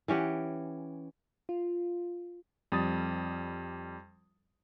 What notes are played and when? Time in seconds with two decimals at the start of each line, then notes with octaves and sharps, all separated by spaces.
0.08 E3 C#4 G4 F#5
1.49 F4
2.72 F2 G3 D#6 A6